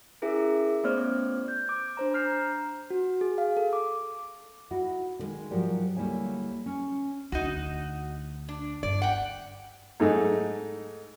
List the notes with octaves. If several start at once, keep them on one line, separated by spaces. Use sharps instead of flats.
C#4 E4 G#4 A#4 E5
A3 B3 C#4 C5 D5 F6
G6
D6
D4 C5 A#5
A#5 F6 G6 C7
F#4
G#4
F5
A4
D6
D#4 E4 F#4
D3 D#3 G#3
G#2 F3 F#3 G4 A#4 D5
D2 G3 A#3 E4 C#5 G#5
C#4
D2 D#4 F#4
D4
G1 D5
F#5 G5
G#2 A3 D#4